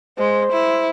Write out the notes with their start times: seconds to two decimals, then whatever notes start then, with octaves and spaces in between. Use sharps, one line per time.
0.18 G#3 C5
0.52 E4